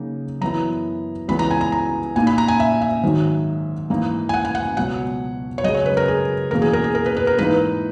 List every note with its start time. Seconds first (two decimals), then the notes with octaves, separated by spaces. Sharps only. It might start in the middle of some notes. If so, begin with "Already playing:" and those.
Already playing: C#3 F#3 A#3 D#4
0.41 F#2 E3 B3 E4 A#5
1.28 C#2 C#3 E3 B3 B5
1.39 A#5
1.51 G#5
1.61 A#5
1.72 A#5
2.16 A#2 A#3 D#4 G#5
2.27 B5
2.38 A#5
2.48 G#5
2.60 E5
2.82 E5
3.03 G#2 D#3 F#3
3.90 G#2 E3 A#3 D#4
4.29 G#5
4.34 F#5
4.45 G#5
4.55 F#5
4.77 C#2 B2 F#3 B3 F#5
5.58 C#5
5.64 F#2 C#3 G#3 D#5
5.74 C#5
5.86 B4
5.97 A#4
6.08 G#4
6.51 E2 B2 A#3 A#4
6.62 G#4
6.73 A#4
6.84 G#4
6.95 A#4
7.06 B4
7.16 B4
7.27 A#4
7.38 G#2 E3 A#3 D#4 B4